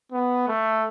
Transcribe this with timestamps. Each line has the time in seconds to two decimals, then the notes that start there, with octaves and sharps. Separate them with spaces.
0.12 B3
0.48 A3